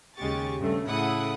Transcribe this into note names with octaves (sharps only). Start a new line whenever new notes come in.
D#2 C#3 G#3 G4 C#6 A6
G2 C#3 A3
A2 C#3 E4 A4 F#5 D#6